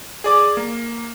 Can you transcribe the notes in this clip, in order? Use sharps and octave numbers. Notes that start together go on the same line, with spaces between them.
G#4 D5 D6
A#3